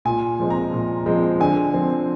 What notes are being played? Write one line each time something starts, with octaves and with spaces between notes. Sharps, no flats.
A#2 G#5
F3 G#3 C4
A#5
A#2
F3 G#3 C4
D3 G#5
F3 C4